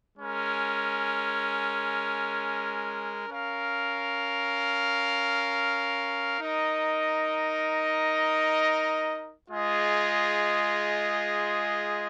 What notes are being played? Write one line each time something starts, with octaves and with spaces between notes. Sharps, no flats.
G#3 C#4 A#4
C#4 A#4 F5
D#4 A#4 D#5
G#3 F4 G#4 D#5